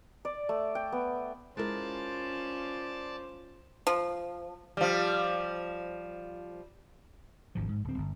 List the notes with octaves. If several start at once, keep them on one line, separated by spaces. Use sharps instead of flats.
D5
A3
G5
B3
G#3 C#4 E4 F4 A#4 C5 D5 A5
F3
F3 G3
G#1 D2 F3
G#2
D1 C4
G1